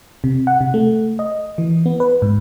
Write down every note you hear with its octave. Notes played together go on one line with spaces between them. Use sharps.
C3
F#5
C3
A3
D#5
E3
B3
B4
G#2